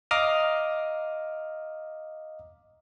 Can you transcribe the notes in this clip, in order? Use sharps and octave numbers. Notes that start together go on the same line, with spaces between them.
D#5 F5 A#5 D6 D#6 F6